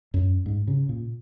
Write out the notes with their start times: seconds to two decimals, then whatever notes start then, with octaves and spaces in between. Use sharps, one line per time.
0.14 F#2
0.46 G#2
0.67 C#3
0.89 A#2